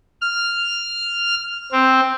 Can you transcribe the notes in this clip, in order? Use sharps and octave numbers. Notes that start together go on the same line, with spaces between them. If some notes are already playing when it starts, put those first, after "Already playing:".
F6
C4